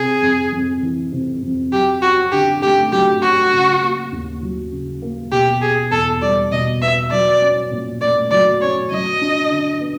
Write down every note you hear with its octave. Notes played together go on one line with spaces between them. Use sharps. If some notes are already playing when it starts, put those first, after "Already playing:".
Already playing: C3 G#4
F2
F2
E3
C3
F2
F#3 G4
C#4 F#4
D3 G4
A3 G4
F#3 G4
C#4 F#4
C#3
A#3
D#2
F#3
C#3
A#3
B2 G4
B3 G#4
E2 A4
G3 D5
B2 D#5
B3 E5
F#3 D5
C#4
A#2
A3 D5
F#3 D5
C#4 C#5
F#3 D#5
D4
D3
B3